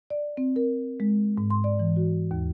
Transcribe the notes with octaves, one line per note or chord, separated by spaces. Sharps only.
D5
C4
A#4
G#3
G#2
C6
D5
E3
F#4
D#2